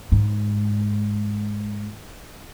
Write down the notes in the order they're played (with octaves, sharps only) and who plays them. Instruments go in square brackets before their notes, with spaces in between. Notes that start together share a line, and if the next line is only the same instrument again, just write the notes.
[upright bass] G#2